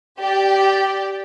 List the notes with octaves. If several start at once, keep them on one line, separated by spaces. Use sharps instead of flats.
G4 D5